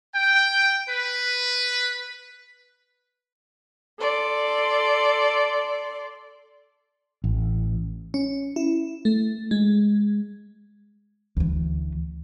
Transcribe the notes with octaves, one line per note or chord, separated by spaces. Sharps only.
G5
B4
A4 D5 C6
A1
C#4
E4
A3
G#3
D2 E3